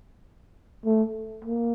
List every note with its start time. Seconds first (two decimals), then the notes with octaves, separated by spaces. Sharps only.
0.85 A3
1.45 A#3